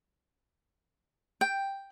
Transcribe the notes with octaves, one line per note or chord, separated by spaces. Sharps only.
G5